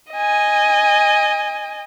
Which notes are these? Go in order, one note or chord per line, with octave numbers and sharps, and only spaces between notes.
D#5 G#5